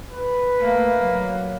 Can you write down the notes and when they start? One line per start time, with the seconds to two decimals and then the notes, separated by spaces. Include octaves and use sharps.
0.11 B4
0.60 A3 A#3
1.00 F#3